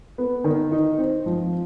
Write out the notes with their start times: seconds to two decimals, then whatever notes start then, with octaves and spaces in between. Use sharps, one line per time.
0.18 B3
0.44 D#3
0.72 D#4
0.98 C4
1.26 F3